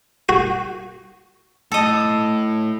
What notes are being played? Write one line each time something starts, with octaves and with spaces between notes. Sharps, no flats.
F#4
A2 A4 D#5